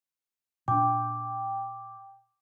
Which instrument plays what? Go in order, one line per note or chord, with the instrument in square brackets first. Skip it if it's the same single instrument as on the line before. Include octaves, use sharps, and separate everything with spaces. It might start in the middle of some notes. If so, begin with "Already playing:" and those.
[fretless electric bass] A#2 D4 [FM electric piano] G5 [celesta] D6